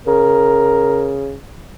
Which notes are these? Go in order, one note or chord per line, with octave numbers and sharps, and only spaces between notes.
C#3 A#4